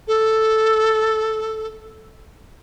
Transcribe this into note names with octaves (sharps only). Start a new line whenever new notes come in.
A4